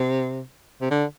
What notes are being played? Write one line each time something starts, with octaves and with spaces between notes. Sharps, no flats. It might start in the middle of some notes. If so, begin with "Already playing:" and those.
Already playing: C3
C3
D3